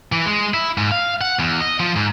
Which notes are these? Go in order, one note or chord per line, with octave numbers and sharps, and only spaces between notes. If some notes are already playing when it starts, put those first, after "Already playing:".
E3
G#3
E4
G#2
F5
F#5
E2
D#5
F3
G#2